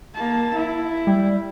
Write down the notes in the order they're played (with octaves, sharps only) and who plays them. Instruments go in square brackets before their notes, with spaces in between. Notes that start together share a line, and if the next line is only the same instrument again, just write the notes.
[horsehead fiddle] A#3 A5
E4
[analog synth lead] G3